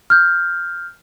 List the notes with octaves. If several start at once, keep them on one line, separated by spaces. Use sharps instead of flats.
F6 G6